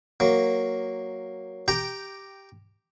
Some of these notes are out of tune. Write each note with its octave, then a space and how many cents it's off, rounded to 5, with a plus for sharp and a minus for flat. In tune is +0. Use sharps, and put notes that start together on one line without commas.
F#3 +0 A#3 +0
G4 +0 G5 -10 A#5 +0